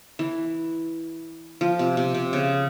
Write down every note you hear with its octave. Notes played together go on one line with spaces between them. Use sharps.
E3
F3
C3
C3
C3
C#3